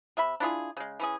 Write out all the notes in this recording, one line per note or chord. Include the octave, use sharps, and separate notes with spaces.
C3 E5 B5
D4 E4 F4 G#4
C#3 G#3
E3 C#4 G#4